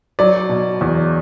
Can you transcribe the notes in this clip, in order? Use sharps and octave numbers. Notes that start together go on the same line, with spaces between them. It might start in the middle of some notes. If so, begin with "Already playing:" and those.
F#3 D5
B2
E2